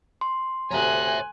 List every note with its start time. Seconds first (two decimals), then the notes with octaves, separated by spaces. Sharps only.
0.21 C6
0.71 D2 C3 C#5 E5 G#5 A#5 F#6